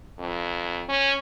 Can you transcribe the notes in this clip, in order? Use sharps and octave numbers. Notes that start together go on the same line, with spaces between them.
F2
C#4